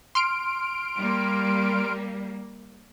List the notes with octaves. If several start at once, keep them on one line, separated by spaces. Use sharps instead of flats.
C6 F6 D7
G3 A#3